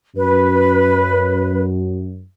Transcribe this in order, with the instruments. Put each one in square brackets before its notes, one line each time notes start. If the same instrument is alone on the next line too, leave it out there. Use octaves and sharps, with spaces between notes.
[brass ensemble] F#2 [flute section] B4